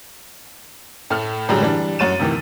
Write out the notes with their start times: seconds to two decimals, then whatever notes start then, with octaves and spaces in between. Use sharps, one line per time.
1.10 A2 A3 F6
1.49 A2 D3 F#3 G3 G#4 A#5
1.61 E3 G3 D4
1.99 F#2 F#4 C#5 A6 D#7 E7
2.19 D2 C3 D#3 E3